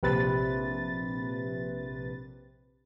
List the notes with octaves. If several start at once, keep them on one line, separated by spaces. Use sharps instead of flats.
A#1 C3 B4 A6